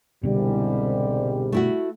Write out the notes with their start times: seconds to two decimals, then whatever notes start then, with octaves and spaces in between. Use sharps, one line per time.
0.23 C2 G#2 B2 D3 G3
1.52 A3 E4 F#4